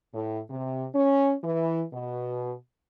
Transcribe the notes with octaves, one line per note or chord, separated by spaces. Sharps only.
A2
C3
C#4
E3
B2